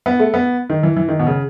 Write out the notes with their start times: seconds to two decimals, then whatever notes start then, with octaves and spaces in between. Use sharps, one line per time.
0.06 B3
0.20 A3
0.34 B3
0.70 D#3
0.83 E3
0.97 E3
1.09 D#3
1.19 B2
1.27 C#3